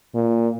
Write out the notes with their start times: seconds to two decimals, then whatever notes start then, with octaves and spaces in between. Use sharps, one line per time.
0.15 A#2